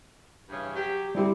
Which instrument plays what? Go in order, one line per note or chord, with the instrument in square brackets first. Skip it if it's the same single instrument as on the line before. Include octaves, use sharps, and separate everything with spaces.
[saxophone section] G2 C#3 E3
F#3 G4
[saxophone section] D2 C4 [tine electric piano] G3 E4 G4